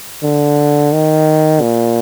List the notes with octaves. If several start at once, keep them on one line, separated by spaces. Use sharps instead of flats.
D3
D#3
A#2